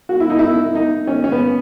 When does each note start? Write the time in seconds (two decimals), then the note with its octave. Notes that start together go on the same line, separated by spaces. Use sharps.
0.09 F#4
0.20 E4
0.30 D#4
0.39 E4
0.75 D#4
1.07 C#4
1.24 C#4
1.32 B3